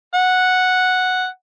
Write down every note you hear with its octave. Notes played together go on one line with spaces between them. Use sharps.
F#5